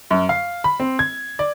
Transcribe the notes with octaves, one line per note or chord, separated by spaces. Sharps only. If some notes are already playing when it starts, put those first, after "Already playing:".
F#2
F5
B5
C4
G#6
D5